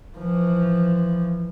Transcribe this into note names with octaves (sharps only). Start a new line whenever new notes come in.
E3 F3